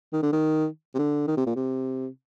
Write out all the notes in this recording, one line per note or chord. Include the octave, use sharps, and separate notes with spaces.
D#3
D3
D#3
C3
D3
D#3
C3
A#2
C3